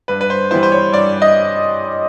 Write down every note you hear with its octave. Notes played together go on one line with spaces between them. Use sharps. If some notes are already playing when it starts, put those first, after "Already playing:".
G2 B4
B4
C5
E3 G3 B3 E4 C5
C5
C#5
G2 D5
D#5